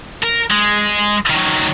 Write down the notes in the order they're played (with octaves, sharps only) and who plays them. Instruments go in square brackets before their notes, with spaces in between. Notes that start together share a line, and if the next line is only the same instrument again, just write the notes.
[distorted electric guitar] A#4
G#3
D#3 F#3